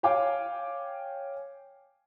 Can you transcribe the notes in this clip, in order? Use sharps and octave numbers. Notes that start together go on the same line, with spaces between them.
C#5 F5 G5 G#5 D6